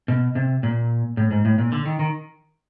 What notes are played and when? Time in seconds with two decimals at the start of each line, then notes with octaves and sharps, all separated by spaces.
0.08 B2
0.35 C3
0.63 A#2
1.17 A2
1.31 G#2
1.45 A2
1.58 A#2
1.72 D3
1.86 D#3
1.99 D#3